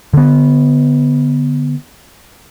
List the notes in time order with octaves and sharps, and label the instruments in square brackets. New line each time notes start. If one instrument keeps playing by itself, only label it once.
[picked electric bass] D3 B3